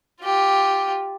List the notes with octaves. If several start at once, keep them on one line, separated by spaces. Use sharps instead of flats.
F4 G4